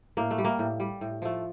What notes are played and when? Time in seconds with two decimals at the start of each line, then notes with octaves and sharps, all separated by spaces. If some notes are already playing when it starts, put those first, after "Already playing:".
0.17 A2 A#3
0.31 A3
0.38 G3
0.45 A#3
0.59 A2
0.80 G3
1.01 A2
1.22 F3 A3